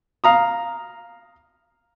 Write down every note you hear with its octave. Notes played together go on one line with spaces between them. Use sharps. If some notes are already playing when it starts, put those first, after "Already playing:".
F5 A#5 D#6